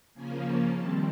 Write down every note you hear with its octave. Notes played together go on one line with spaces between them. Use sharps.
C#3 F3 A#3 C#4 G#5
A5
C3 D#3 G3 C4 A5